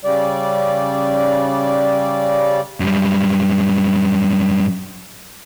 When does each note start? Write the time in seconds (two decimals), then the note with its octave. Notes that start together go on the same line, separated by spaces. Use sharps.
0.04 C#3 G3 D5
2.80 F#2 G3